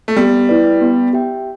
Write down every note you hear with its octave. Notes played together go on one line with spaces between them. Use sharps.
A3
G3 B3
E4 G4 B4 D5
B3
G4 E5 G5